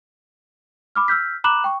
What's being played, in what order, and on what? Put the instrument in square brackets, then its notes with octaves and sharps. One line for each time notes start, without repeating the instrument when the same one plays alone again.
[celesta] B5 D6 F6
E6 F6 G6 B6
A#5 B5 D6 F#6 E7 F#7
G5 C#6